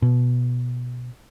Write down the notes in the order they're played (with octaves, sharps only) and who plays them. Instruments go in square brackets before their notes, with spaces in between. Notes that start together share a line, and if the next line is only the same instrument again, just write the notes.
[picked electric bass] B2